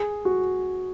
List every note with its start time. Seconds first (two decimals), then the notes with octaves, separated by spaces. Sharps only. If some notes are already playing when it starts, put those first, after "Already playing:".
Already playing: G#4
0.25 F#4